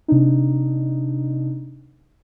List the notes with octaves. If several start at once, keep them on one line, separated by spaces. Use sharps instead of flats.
C3 D4 D#4